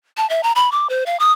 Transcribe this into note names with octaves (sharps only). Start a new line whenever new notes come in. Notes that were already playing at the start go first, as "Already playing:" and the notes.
A5
E5
A#5
B5
D6
C5
F5
D#6